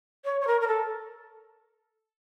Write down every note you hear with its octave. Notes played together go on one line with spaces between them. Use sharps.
C#5
C#5
A#4
A#4
A4